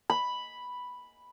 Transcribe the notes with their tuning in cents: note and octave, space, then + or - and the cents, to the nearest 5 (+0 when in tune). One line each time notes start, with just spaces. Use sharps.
B5 +0